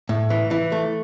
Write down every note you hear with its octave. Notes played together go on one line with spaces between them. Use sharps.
A2
E3
E3
A3